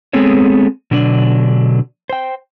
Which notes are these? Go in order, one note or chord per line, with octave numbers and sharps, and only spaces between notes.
G#3 B3 C4 G#4 A4 C#5
B2 D3 F#3 D4 D5
C5 G5